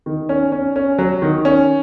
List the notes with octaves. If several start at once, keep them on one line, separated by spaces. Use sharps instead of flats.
D#3
C#4
C#4
C#4
F#3
D#3
C#4